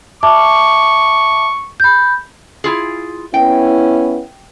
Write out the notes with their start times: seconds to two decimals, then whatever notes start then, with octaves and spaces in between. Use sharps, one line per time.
0.23 E5 A5 C#6 D6
1.80 B5 G6
2.64 E4 F4 G#4
3.34 B3 C#4 E4 G5